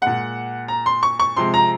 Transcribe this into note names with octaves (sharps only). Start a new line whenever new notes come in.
A#2 G#3 F#5
A#5
C6
C#6
C#6
C3 F3 G#3 C6
A#5